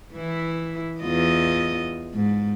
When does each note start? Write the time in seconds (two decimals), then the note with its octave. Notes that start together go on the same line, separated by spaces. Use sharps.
0.13 E3 E4
1.01 E2 F4 D#5
2.14 G#2